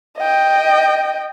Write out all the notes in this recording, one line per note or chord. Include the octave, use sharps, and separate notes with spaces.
D#5 G5